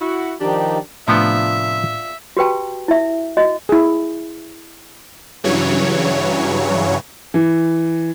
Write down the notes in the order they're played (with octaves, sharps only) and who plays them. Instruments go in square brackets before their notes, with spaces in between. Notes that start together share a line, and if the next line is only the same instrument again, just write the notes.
[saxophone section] E4 F#4
[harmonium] D#3 F3 D#4 [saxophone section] D4 G4
[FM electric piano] A2 [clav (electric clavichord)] C3 F3 B3 [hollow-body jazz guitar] D4 F4 [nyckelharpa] E5
[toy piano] F#4 G4 B4 G5 A5
E4 E5
F#4 D#5
[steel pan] E4 G#4
[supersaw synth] G2 C#3 E3 F#3 C#5
[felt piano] E3